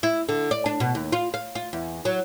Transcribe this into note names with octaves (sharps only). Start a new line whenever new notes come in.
E4
D3
D5
D4
B2
D#2
F4
F5
F4
E2
F#3